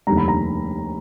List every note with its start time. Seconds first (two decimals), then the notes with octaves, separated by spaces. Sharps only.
0.07 F1 D#2 D3 G3 A#5
0.17 B5
0.28 A#5